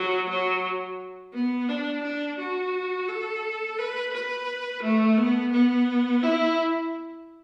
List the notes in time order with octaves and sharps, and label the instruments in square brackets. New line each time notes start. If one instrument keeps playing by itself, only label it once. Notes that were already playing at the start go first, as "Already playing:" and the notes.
Already playing: [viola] F#3
F#3
B3
D4
D4
F#4
A4
B4
B4
A3
B3
B3
E4